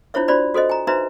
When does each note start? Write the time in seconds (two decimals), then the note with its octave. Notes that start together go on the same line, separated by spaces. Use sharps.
0.14 D4 E4 F4 C5 C#5 E5
0.28 D4 F4 F#4 C5 D5 B5
0.54 F#4 A4 C5 D#5
0.70 G#5 A#5
0.87 D#4 F#4 B4 C5 E5 A#5